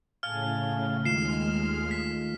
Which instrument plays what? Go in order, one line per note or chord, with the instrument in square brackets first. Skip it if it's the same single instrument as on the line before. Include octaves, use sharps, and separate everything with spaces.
[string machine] A2 C#3 [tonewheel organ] F5 G#5 A5 [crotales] F6
[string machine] D#2 G#3 F6 [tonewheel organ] D#3 A3 F4 [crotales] C7 E7
[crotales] B6